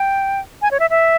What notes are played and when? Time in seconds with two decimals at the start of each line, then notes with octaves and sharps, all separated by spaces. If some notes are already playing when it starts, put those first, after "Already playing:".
Already playing: G5
0.62 G#5
0.71 C#5
0.80 E5
0.90 E5